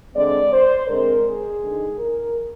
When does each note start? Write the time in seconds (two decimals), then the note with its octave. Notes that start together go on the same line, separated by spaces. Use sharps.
0.14 D3 G#3 C4 D5
0.51 C5
0.88 D3 G#3 C4 A#4
1.24 G#4
1.61 D3 G#3 D#4
1.98 A#4